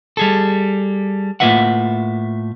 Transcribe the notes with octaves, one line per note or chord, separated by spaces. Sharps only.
G3 G#4 A4
A2 A#3 F4 B4 E5 F#5